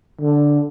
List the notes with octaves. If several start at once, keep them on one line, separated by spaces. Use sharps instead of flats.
D3